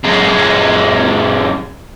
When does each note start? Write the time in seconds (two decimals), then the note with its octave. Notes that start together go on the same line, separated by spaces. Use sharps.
0.04 F#2 G#3